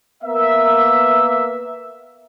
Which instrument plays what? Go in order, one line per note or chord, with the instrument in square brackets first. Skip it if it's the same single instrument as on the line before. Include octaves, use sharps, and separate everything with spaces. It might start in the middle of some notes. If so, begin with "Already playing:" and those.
[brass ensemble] A#3 B3 A#4 E5